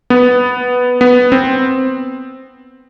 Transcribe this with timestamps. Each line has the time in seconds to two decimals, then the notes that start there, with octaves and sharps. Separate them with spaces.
0.10 B3
1.01 B3
1.32 C4